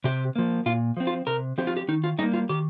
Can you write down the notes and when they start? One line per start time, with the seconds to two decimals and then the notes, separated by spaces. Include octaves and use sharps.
0.04 C3 G4
0.36 F3 A#3
0.66 A#2 F4
0.97 F3 C4
1.07 F4
1.27 C3 A#4
1.58 F3 C4 G4
1.67 F4
1.77 G4
1.88 D#3 D#4
2.04 F4
2.18 G3 D#4
2.23 A#3
2.34 F4
2.49 D#3 G4